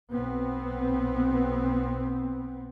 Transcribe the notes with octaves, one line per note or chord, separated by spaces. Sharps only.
B1 B3 C4